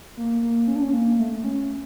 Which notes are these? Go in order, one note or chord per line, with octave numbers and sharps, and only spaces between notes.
A#3
A#3
C#4
D4
C#4
A#3
A3
C#4